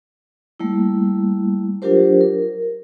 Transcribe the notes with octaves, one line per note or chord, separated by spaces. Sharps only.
G3 A3 A#3 E4
F#3 D4 F4 G4 A#4 C5
A#4